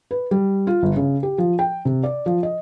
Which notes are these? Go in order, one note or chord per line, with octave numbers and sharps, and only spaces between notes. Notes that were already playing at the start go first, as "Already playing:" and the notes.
B4
G3
F4
G1
C#3
G4
F3
G5
C3
D5
F3
D#5